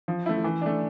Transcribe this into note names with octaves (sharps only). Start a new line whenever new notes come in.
F3
A3 E4
E3
A3 D4